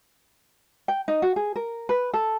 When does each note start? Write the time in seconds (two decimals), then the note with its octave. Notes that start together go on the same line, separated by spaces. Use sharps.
0.88 G5
1.08 D#4
1.22 F#4
1.36 G#4
1.56 A#4
1.89 B4
2.14 A4